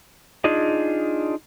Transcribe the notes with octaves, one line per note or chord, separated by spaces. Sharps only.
D4 D#4 F4 G#4 D5 D#5